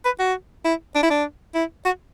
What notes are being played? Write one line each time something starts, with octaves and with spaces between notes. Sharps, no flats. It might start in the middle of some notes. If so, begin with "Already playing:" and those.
B4
F#4
E4
D4
E4
D4
E4
F#4